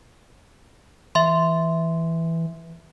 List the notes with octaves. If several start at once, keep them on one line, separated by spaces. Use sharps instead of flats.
E3 E5 C6